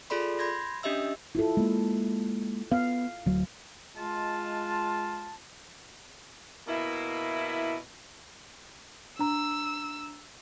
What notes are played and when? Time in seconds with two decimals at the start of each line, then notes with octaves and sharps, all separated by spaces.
0.10 F4 G#4 A4 D5 B5 C6
0.39 B5 C6 G6 G#6 A#6
0.83 C#4 D4 G4 D#5 E5 E6
1.35 E4 F4 A4
1.57 G#3 A#3
2.72 B3 F5
3.26 D1 F#3
3.96 G#3 F4 A5
6.68 B2 A#3 E4
9.19 D4 A#5 E6